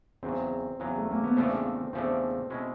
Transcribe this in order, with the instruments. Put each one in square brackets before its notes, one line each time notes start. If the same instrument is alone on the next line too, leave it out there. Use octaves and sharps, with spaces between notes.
[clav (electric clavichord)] E2 C#3 F#3 [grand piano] C4
[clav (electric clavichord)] E2 C#3 F#3
[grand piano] A3
A#3
B3
[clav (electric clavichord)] E2 C#3 F3 A3 D4 [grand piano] C4
[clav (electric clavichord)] E2 C#3 F3 A3 D4 [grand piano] C4
[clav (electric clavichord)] B2 G#3 C#4 E4